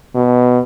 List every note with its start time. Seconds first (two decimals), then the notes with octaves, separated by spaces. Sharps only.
0.15 B2